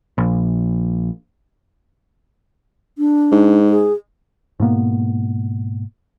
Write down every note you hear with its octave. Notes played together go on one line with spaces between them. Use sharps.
A#1
D4
G#2
G#4
G#2 B2 A#3 B3